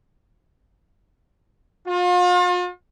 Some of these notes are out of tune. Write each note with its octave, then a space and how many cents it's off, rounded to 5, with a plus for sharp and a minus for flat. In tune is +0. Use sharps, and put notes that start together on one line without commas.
F4 +40